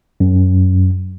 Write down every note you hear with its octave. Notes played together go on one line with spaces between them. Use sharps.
F#2